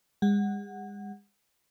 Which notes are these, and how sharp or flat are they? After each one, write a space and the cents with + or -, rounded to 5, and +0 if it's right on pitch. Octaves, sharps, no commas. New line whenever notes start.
G#3 -40 F#5 +0